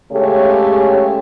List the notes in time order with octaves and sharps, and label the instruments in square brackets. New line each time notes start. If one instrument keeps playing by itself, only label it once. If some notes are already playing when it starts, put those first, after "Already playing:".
[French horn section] C#3 G#3 A3 G4 C#5